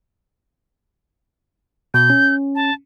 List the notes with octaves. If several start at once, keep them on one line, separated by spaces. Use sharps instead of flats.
B2 G6
C#4
A5